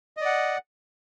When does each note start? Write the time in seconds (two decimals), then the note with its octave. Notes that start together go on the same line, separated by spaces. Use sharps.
0.17 D#5
0.21 D5
0.25 F#5